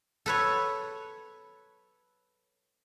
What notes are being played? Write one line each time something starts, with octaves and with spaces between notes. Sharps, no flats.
A4 B4 C#5